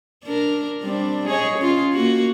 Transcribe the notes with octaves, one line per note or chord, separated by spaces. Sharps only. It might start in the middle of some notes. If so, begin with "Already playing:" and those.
D4 A#4
G3 C4 D4
G#4 C#5 D#5
C#4 F4
A#3 F#4